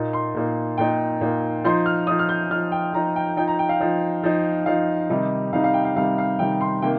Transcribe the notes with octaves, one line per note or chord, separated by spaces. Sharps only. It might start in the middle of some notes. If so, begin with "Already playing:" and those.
Already playing: A#2 A#3 D#4
C6
A#2 A#3 D#4
A#2 A#3 D#4 G5
A#2 A#3 D#4
F3 D#4 C6
F6
F3 D#4 D#6
F6
G6
F3 D#4 F6
G5
F3 D#4 A#5
G5
F3 D#4 G5
A#5
G5
F5
F3 D#4
F3 D#4
F3 D#4 F5
C3 D#3 G3 D#4
C3 D#3 G3 D#4 F5
F5
G5
F5
C3 D#3 G3 D#4 F5
F5
C3 D#3 G3 D#4 G5
C6
C3 D#3 A#3 G5